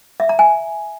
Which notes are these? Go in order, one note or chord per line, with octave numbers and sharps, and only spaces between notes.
E5
A#5
G#5